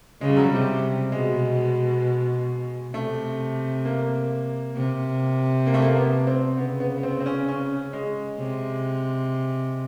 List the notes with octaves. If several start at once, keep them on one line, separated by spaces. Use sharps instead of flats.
C#3 G#3
G3
F#3
G3
C3
B2 G#3
C3 A3
A#3
C3
A#3
A3
A#3
B3
C4
C#3 B3
B3
B3
C4
C4
C#4
C#4
G#3
C3